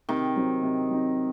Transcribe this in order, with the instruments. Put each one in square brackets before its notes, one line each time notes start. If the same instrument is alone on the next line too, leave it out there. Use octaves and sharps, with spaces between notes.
[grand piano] C3 [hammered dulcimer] D#3
[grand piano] F#3 C4 D#4
C3
F#3 C4 D#4